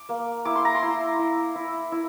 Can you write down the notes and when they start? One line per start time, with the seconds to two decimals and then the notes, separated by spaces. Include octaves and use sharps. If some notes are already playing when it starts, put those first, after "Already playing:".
Already playing: D6
0.09 A#3
0.45 E4 D6
0.55 C6
0.65 A#5
0.75 C6
0.83 E4
1.19 E4
1.55 E4
1.92 E4